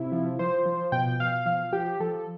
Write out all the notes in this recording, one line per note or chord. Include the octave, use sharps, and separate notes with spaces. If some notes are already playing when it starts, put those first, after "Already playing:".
Already playing: C3 E4
F3
F3 C5
F3
B2 G5
B2 F5
F3 F5
F3 G4
F3 A4